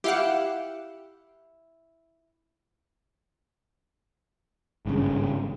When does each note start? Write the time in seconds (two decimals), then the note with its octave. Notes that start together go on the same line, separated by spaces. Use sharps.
0.04 E4 G4 F5 F#5
4.86 G#1 G2 C#3